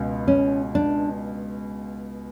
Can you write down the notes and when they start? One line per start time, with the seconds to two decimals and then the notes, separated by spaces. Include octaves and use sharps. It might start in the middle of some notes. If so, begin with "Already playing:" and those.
Already playing: C#2 B2
0.28 C#4
0.75 D4